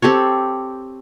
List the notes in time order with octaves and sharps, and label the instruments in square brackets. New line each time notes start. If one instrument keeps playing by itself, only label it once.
[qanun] C4 G4 A4 C#5